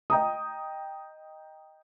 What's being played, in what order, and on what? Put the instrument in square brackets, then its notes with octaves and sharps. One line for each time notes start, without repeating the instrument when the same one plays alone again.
[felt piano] D#5 G5 A#5 D#6